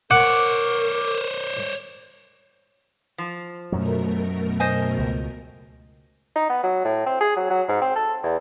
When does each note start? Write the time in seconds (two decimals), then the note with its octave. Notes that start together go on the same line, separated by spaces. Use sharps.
0.11 A#4 C5 C#5 F#5 D6
3.18 F3
3.72 F#2 B2 F#3 A3 A#4
4.60 C5 D#5 G#5
4.99 C#2
6.36 D#4
6.50 B3
6.64 F#3
6.85 A2
7.06 C4
7.21 G#4
7.36 F#3
7.50 F#3
7.69 G#2
7.82 C4
7.96 A4
8.23 E2